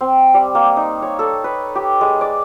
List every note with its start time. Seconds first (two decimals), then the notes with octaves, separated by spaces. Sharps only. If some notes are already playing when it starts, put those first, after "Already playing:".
0.01 C4
0.34 G3
0.55 A#3
0.77 D#4
1.02 C#5
1.19 A4
1.44 B4
1.75 G4
2.01 G#3
2.21 D5